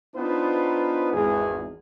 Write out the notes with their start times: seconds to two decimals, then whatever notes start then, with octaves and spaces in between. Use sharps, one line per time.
0.14 B3 D4 D#4 F4 B4 C5
1.12 G#1 E2 G#4